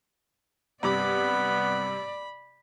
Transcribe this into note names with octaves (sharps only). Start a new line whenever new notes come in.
G2 C3 B3 D5 B5 D6